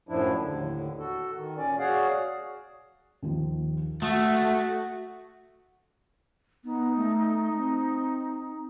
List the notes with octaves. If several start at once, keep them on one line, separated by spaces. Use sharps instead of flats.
F#2 A2 F3 D4 E4
D#2 A2 D3
F#4 A4
D#3
A#2 C#4 D5
F#4 G#4 C#5 D5 F5 F#5
D#2 D#3 F3
A3 F#4 D#6
B3 D#4
A3
C4